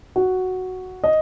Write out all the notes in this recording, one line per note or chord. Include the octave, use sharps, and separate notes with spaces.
F#4
D#5